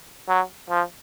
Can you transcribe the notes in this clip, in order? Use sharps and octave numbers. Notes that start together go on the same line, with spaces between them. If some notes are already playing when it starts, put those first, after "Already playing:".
F#3
F3